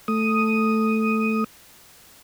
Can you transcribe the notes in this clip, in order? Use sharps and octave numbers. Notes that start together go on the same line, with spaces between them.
A3 D#6